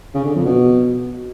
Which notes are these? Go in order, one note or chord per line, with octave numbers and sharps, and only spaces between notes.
C#3
D3
F2
B2